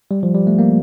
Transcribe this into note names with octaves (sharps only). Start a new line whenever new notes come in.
G3
F3
G3
A3
A#3